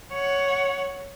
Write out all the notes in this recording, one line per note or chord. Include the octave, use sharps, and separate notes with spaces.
C#5 F#5